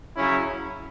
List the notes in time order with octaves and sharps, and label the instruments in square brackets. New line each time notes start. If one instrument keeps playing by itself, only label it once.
[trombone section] C#3 F#3 C#4 E4